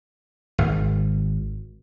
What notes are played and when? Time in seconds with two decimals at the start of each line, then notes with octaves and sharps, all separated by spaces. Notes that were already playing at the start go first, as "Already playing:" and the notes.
0.58 G#1